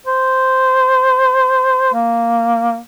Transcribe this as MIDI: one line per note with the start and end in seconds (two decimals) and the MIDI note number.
0.06 1.91 72
1.93 2.78 58